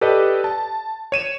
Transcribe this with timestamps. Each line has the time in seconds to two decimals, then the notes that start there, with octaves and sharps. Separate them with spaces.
0.01 G4 A4 B4 D5 D#5
0.44 A5
1.12 C#5 D#7 E7